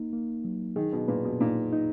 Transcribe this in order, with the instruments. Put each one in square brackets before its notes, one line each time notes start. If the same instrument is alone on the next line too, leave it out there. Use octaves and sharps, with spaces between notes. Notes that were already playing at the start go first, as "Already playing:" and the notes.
Already playing: [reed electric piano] A#3 D#4
A#3
F#3
[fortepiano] D#3 [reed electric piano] G#4
[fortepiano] B2
[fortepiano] A#2 [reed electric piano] B4
[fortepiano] B2
[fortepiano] A#2 [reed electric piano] D#4
[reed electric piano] D#4